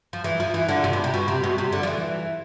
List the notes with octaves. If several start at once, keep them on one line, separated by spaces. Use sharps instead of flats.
F3
E3
F3
E3
D3
C3
B2
C3
B2
C3
B2
C3
D3
F3
E3